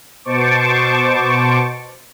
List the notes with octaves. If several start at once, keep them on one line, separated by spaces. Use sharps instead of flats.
B2 C5 A5 C#6 D6